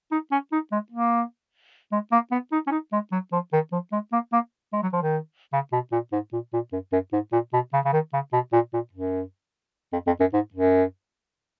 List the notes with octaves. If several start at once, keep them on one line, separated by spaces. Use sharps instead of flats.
D#4
C#4
D#4
G#3
A#3
G#3
A#3
B3
D#4
C#4
D#4
G#3
F#3
F3
D#3
F3
G#3
A#3
A#3
G#3
F#3
F3
D#3
C#3
B2
A#2
G#2
A#2
A#2
F#2
F#2
G#2
A#2
B2
C#3
C#3
D#3
C#3
B2
A#2
A#2
F#2
F2
F2
F#2
G#2
F#2